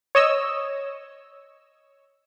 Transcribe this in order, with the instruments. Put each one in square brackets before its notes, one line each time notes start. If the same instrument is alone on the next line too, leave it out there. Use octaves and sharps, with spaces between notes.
[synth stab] C#5 D#5 E6